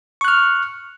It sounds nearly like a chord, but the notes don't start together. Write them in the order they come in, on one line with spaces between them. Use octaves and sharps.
C#6 F#6 F6